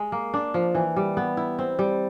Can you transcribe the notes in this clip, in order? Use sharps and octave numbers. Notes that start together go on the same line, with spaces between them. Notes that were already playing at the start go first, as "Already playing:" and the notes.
Already playing: G#3
A#3
D4
F3
E3
G3
B3
E4
C4
G3